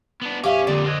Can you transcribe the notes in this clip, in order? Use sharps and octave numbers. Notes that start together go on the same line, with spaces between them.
B3 D4 D6 A6
A#1 F2 C#4 G4 E5 F5 D6
F2 A#2 D3 D5 D#6
C4 D#5 D6 F#6 G#6